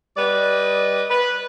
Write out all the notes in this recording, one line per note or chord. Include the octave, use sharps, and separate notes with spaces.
G3 B4 D5 D#5
B4